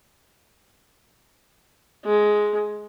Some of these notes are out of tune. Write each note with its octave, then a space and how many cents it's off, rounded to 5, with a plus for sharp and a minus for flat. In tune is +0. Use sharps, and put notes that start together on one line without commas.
G#3 +10